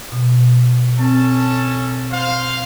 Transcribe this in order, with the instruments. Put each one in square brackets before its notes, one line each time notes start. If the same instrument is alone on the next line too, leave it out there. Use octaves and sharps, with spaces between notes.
[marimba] B2
[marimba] C4 [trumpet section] C#4 A4 A5
[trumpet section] C5 F5